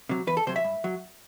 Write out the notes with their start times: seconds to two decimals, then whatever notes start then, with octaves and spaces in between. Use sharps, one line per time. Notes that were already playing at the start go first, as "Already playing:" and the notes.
0.09 C3 F#3
0.27 E2 B4
0.37 A4
0.47 C3 F#3 C5
0.56 E5
0.64 G2
0.84 F#3